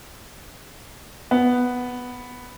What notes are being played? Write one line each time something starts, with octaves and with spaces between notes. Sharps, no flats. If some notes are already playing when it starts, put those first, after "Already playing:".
B3